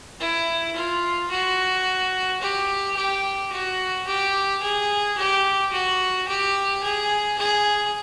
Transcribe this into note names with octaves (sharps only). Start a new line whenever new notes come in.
E4
F4
F#4
G4
G4
F#4
G4
G#4
G4
F#4
G4
G#4
G#4